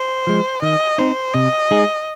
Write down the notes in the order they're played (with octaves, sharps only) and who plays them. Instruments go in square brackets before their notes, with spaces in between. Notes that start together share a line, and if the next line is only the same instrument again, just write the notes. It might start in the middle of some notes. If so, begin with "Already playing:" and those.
Already playing: [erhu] C5
[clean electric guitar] F3 G#3
[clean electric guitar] D#3 [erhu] D#5
[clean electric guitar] C4 D#4 [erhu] C5
[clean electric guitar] C3 [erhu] D#5
[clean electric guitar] G#3 D#4 G#4